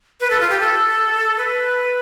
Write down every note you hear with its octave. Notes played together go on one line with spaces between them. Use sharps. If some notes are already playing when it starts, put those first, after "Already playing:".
B4
A4
F4
G4
A4
B4